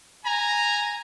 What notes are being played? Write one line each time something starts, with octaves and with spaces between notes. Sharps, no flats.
G#5 A#5